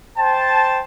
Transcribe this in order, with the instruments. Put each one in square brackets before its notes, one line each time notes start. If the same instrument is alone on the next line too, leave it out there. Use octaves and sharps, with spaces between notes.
[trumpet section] C5 G5 A5